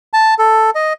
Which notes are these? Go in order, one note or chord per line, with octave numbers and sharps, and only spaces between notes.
A5
A4
D#5